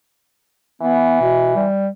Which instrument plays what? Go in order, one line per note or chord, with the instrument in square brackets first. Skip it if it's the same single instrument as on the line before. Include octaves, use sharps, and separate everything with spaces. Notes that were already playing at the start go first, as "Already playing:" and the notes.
[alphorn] E3 [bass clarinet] B3
[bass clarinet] B2
G3